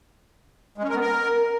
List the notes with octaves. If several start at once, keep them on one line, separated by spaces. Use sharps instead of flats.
G#3
C#4
A#4
B3
A#4